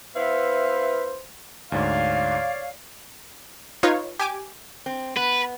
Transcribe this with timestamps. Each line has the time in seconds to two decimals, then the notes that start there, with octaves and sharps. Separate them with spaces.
0.16 B3 E4 B4 C5 E5 F5
1.72 D2 G#2 C#5 D5 F5
3.83 D#4 F4 B4 C#5 F5
4.20 G4 G#5 D6
4.86 C4
5.16 B3 B4